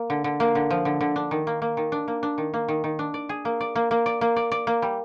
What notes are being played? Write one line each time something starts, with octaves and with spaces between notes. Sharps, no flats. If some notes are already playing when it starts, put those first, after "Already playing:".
Already playing: A#3
D3
D3
A#3
D3
F3
D3
D3
D4
D#3
A#3
A#3
D#3
D4
A#3
D4
D#3
A#3
D#3
D#3
D4
D5
G#4
A#3
D5
A#3
A#3
D5
A#3
D5
D5
A#3
G3